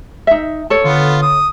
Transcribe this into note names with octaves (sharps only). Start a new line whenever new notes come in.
D#4 E5
A4 C#5
D3 B3 F4
D#6